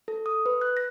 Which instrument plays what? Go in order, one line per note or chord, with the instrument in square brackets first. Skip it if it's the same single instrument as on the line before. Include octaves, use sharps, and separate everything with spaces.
[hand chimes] A4
D#6
B4
F#6
A#6